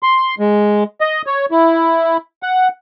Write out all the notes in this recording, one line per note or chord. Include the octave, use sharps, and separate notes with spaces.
C6
G#3
D#5
C#5
E4
F#5